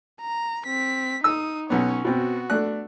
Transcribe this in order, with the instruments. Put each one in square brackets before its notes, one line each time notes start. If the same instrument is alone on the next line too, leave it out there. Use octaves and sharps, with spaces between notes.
[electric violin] A#5
C4 B6
[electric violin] D#4 D#6 [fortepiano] E6
[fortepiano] B1 B3 [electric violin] C#4 C#5
[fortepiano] B2 C4 [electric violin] B3 F#4
[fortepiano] A3 D4 F#6